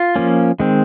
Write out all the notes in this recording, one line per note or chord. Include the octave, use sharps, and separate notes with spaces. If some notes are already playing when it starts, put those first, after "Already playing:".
Already playing: F4
F3 A#3 C#4
D#3 G#3 C4